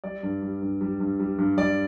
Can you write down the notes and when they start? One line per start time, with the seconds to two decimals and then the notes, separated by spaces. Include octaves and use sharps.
0.04 G3 D5
0.23 G2
0.42 G3
0.62 G2
0.81 G3
1.00 G2
1.19 G3
1.38 G2
1.57 G3 D5